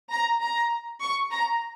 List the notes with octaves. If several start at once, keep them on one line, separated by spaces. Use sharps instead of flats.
A#5
A#5
C#6
A#5